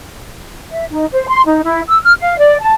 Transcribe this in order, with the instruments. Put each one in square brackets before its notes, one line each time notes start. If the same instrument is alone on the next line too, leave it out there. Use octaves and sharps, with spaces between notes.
[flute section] E5
D#4
C5
C6
D#4
E4
E6
F6
F5
D5
A5